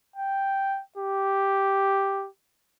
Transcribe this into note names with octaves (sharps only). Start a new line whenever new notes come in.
G5
G4